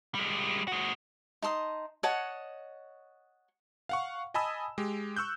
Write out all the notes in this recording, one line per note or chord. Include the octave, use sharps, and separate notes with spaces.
G3 G#3
G#3 F#4
D#4 A5 C6 D#6
C#5 D#5 F#5 A5
F5 F#5 C#6
D#5 G#5 A5 B5 D#6 E6
G#3 G4
C#6 E6 F#6 G6